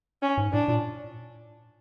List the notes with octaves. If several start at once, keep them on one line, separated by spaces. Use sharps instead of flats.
C#4
G#2
A2 D4
A#2